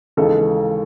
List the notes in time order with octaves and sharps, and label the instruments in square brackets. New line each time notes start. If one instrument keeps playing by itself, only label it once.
[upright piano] D#2 C#3 E3 G#3 A4